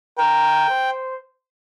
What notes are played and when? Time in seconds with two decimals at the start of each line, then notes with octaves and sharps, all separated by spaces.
0.18 A#4 G5
0.70 C5